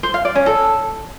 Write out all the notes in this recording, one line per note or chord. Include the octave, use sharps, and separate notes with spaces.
C5
F5
D5
C#4
A4